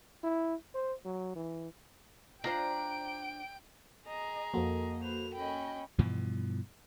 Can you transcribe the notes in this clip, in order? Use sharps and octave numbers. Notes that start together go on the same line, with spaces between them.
E4
C5
F#3
E3
D4 F4 C5 G5 A#5 D7
G#4 D#5 A#5
F2 F3 A#3 F#4 A4 D#5
B4 C5 F7
C#4 D#5 G5 B5
G2 B2 E3 F3